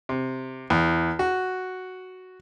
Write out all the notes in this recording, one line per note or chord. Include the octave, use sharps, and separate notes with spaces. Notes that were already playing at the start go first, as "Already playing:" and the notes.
C3
E2
F#4